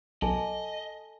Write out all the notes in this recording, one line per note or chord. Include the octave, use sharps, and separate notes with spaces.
B1 A4 D#5 G#5 A5